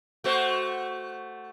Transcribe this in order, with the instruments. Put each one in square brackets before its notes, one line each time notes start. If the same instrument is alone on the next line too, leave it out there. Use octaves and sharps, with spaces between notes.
[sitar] A3 F#4 C5